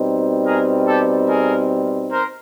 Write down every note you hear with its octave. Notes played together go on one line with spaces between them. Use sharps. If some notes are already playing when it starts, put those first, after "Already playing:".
Already playing: B2 G3 C4 D#4
G#4 A#4
G4 A4
G#4 A#4
A#4 C5